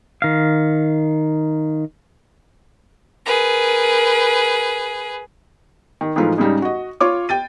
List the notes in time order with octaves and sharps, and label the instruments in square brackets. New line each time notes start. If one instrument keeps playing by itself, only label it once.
[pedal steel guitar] D#3 F5
[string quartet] G#4 B4 [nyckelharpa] A#4
[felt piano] D#3
G#2 E3 F3 A3 D#4 F4
G#2 C#3 G3 D#4
F#4 D#5
F4 C#5 D6
G5 A6 D#7